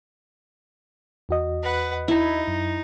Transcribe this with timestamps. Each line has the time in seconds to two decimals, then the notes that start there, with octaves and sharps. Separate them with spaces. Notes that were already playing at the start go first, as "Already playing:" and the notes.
1.29 E2 F#4 D#5
1.63 B4 F#5
2.08 D#4 E4
2.48 F#2